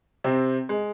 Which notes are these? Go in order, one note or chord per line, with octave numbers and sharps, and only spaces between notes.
C3 C4
G#3